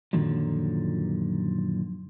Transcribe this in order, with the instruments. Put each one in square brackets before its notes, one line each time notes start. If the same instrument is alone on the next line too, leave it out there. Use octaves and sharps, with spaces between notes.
[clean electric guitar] F#2 A#2 D3 D#3 F3 F#3